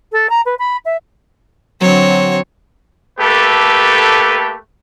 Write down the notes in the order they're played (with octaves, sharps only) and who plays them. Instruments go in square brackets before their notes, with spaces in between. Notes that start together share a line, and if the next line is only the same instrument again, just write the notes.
[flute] A4
A#5
B4
B5
E5
[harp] D3 F#3 [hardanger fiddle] C4 C#5
[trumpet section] A3 A#3 G4 A4 B4